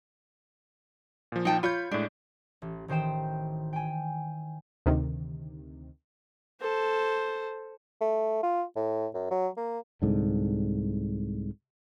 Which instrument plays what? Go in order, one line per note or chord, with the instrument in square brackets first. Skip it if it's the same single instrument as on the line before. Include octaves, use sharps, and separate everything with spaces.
[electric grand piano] A#2 F3
[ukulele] D#4 G5 A5
[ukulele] F4 C#5 [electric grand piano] B5 G6
[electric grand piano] A2 G#3 [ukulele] D4
[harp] A1
A1 D#3 C5 G5 E7
G5 G#5
[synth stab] D2 C3 D#3
[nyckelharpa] A4 C5
[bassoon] A3
F4
A2
F#2
F#3
A#3
[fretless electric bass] C2 G#2 D3